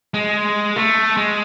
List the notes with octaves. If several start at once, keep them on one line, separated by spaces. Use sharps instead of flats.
G#3
A3
G#3